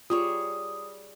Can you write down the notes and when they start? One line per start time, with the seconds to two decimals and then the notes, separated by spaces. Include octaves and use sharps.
0.10 G3 F4 G#4 C#5 D#6